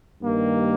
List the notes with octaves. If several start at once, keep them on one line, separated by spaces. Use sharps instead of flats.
G2 D#3 G3 A#3